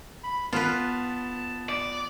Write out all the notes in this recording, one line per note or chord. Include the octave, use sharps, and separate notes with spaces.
B5
B3 F4 B4 A5
D5